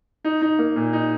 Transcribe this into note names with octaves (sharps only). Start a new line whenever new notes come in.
D#4
D#4
A#3
A#2
D#4